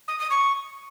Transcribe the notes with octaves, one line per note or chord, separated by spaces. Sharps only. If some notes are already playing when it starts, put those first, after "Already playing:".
D#6
D#6
C#6